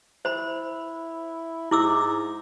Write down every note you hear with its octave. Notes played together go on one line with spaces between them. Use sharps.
E4 C5 B5
G#2 E4 D6 E6